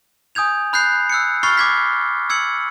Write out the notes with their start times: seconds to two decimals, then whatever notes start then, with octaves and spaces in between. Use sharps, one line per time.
0.35 G#5 D#6 G6 G#6 F7
0.73 B5 F#6 G6 C7
1.10 E6 F#6 G#6 C#7
1.43 B5 C#6 F6 A6 C7 G7
1.57 D6 G#6 B6
2.30 E6 G#6 C#7 F#7